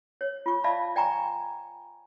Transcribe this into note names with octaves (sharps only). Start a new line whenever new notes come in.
C#5
F4 C#6
D5 E5 F5 A5 B5
D5 G5 G#5 A#5 C#6